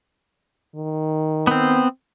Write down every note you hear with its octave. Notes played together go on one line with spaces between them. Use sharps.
D#3
B3 C4